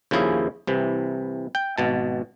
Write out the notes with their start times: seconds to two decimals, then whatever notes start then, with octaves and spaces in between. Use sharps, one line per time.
0.11 D#2 C#3 F3 E4 G#4
0.67 C2 C3 E3
1.55 G5
1.78 G#1 B2 A5